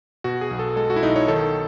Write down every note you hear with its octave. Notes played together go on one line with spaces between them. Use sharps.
B2 F#4
G#4
B1
A4
G#3 A4
F#4
E4
B1 D#4
C#5
D#3 A4